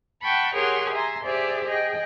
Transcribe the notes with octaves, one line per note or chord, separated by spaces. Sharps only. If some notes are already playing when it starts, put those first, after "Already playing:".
F#5 G5 A5 B5 C#6
G4 G#4 A#4 C#5 F#5 C6
E5 G#5 A#5 C6
G4 G#4 C5 D5 E5
G#4 D#5 G5